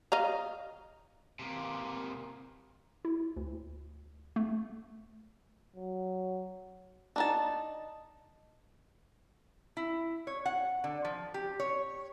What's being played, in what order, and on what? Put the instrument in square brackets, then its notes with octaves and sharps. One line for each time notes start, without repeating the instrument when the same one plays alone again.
[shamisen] D#5 F5 A#5
[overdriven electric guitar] C3 A#3
[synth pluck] E4
D2
A3
[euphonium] F#3
[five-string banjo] D4 D#4 A5
[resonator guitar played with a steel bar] E4
C#5
F#5
D3
F3
G4
C#5